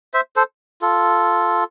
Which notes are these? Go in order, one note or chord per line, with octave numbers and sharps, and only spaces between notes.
C5 E5
A4 C5
F4 A4